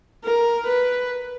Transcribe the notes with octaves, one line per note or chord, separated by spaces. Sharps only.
A#4
B4